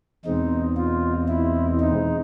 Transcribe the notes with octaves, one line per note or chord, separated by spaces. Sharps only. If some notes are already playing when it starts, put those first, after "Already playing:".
E2 B2 G#3 C4 D#4
F4
E4
D#4